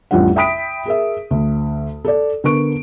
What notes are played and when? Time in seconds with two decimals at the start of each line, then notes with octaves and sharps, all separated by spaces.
0.11 A1 F2 F3 G3 D4 F#5
0.36 E5 G5 B5 D#6 B6 D7
0.86 G#4 A#4 E5
1.31 D2
2.05 A4 D5
2.44 D3 B3 A#4 C#6 D7